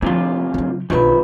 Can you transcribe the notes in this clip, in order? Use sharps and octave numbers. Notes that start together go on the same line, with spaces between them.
D2 C3 F3 A#3 F4
C#3 F#3
B1 F2 D#3 F#3 D4 F4 B4 B5